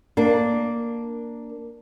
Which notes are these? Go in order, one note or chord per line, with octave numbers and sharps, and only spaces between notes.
A#3 D4